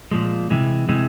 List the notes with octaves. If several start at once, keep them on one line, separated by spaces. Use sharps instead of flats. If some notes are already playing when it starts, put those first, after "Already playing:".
A#2 F3 G#3
C3 E3 G#3
C3 E3 G#3